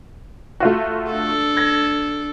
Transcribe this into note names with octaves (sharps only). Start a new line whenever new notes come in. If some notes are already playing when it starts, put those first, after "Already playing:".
A3 F4 F#4
D4 A4
G#6 A#6